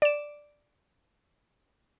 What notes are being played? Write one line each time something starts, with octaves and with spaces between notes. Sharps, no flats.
D5 E7